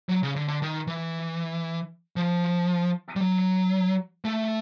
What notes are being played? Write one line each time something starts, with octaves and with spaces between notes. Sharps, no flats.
F#3
C#3
D3
D3
D#3
E3
F3
G3
F#3
A3